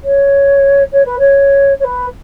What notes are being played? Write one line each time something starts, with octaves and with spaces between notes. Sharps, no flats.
C#5
C#5
B4
C#5
C#5
B4